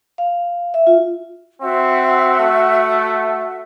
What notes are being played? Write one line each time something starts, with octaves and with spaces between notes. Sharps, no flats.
F5
E5
F4
C4 F#4 E5 F#5
A3